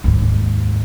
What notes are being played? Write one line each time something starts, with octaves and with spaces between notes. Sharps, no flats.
D#2 G#2